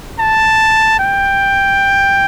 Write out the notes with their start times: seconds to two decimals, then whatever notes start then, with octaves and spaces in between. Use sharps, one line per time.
0.20 A5
0.99 G5